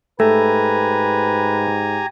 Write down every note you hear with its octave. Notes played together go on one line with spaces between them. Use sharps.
G#2 A3 G4 B4 G#5 A#5